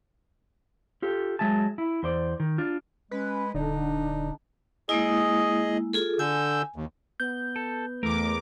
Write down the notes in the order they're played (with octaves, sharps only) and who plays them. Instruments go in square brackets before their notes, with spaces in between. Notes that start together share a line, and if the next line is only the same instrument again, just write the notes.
[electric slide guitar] F4 G4 A4
F#3 G#3 E5 G#5 A5
E4
E2 C5 D5
D#3
D4 F4
[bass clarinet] G#3 [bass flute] C#4 [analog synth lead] B4
[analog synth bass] D#1 [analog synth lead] D3 [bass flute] D4 [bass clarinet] D#4
[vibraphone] G#3 A#3 E4 [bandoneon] G#4 D#5
[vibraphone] F4 G#4 A4
[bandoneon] D3 E6 G6 [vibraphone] G#5
[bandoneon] D#2
[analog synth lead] B3 [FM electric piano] G6
[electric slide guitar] A4
[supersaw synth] E2 D6 [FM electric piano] A3 [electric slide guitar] A#4